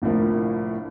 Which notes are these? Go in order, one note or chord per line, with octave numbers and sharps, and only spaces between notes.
G1 C2 A2 F3 A#3